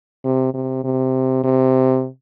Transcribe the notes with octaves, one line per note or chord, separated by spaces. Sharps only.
C3
C3
C3
C3